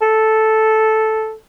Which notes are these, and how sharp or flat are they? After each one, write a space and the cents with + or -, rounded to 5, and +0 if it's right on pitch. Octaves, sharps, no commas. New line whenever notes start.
A4 -5